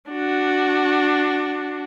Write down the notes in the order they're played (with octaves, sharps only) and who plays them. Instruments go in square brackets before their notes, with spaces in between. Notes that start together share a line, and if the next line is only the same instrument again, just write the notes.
[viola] D4 F#4